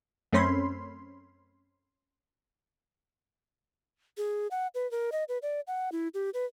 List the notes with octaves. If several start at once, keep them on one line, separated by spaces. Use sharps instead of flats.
F#2 A3 C4 C#4 B5 C6
G#4
F#5
B4
A#4
D#5
B4
D5
F#5
E4
G4
B4